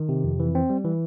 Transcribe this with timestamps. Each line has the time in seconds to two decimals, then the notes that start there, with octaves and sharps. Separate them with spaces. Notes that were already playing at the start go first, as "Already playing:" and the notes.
Already playing: D#3
0.09 C3
0.24 F2
0.40 E3
0.55 C4
0.70 G3
0.85 E3